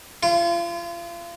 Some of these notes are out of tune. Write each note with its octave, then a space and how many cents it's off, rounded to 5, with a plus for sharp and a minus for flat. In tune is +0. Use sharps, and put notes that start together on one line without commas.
F4 -35